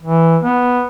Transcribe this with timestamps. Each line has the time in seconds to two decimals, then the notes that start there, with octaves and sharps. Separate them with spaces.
0.03 E3
0.43 B3